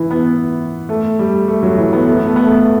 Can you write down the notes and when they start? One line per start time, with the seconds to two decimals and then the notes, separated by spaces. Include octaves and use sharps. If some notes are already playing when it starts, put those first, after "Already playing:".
Already playing: E3
0.11 B3
0.89 A3
1.19 G3
1.48 A3
1.63 F#3
1.77 E3
1.93 B3
2.07 A3
2.17 B3
2.27 A3
2.36 B3
2.45 A3